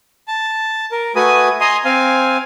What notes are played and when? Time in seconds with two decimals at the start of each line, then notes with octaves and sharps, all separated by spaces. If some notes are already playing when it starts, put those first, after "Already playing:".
0.28 A5
0.92 A#4
1.15 A3 F#4 B4 G#5 D#6
1.61 D#5 G#5 A#5 C6 D#6
1.85 C4 F5 G#5